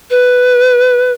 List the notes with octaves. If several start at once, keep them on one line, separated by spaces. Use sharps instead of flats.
B4